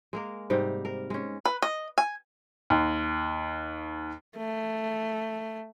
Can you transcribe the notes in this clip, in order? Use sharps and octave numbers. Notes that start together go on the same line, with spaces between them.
G#3 A#3 A#4
G#2 C3 G3 D#4
A#4
G#3 C#4
B4
D#5
G#5
D#2
A3